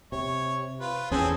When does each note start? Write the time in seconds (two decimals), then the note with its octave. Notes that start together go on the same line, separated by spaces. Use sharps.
0.12 C3 C#5
0.80 F4 B4
1.11 E2 C4 C#4 G#4 A4